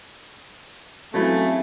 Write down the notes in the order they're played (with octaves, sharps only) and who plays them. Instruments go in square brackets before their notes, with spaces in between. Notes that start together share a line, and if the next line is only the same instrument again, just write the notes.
[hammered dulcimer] C#3 E3 [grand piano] F#3 G#3 [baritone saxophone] A3 [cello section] C4